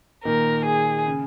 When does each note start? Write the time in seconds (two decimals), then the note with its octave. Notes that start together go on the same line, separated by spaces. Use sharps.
0.25 A#2 D#3 A#4
0.66 G#4
1.06 C#3